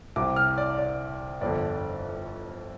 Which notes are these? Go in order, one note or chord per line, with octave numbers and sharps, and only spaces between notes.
C2 C3 D6
F6
D5
D5
G1 F2 D3 D5